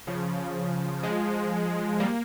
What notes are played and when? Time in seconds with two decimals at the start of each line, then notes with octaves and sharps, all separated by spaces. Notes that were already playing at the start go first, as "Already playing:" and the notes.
0.07 C#3 F3
1.03 F3 G#3
2.00 G3 A#3